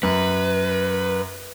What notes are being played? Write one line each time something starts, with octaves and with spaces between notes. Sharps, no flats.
F#2 B4